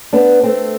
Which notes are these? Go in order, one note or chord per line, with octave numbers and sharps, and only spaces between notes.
B3 D4
A3 C4